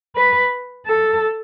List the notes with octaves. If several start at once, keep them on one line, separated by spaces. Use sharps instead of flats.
B4
A4